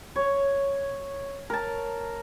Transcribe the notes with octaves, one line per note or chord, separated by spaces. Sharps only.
C#5
A#4 A5